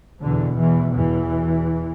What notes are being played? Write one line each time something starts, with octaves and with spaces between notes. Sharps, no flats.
E2 B2 D3
E2 E3
E2 E3